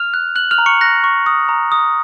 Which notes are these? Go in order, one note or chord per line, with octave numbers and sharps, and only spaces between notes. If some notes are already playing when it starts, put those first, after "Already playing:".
Already playing: F6 F7
F#6
F#6 F#7
F6 F7
A#5
C#6 C#7
F#6 A#6
C#6
D#6
A#5
D#6